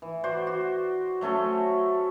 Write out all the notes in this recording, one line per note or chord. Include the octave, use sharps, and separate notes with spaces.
E3
F#4 C5 D5
F#4
F#3 A3 C#4 A4